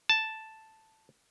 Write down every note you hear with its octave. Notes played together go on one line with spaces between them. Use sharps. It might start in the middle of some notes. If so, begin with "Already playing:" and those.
A5